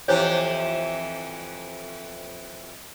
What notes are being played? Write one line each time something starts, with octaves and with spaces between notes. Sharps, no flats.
F2 E3 E4 G4 C5 C#5